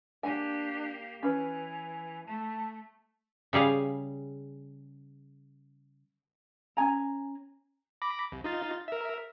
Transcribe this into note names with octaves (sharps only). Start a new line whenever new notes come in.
A#3 D4 G4 G#5
E3 C#4 B4 G#5
A3 A5
C#3 G3 G#4 F5
C#4 D4 G#5 A#5
B5 D6 A#6
C2
D#4 F4 A6
A#4 E5